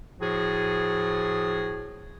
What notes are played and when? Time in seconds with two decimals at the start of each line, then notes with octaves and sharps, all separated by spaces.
0.21 A2 F3 F#4 G#4